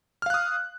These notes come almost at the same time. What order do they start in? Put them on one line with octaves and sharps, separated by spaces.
F6 F5 F#6 D#6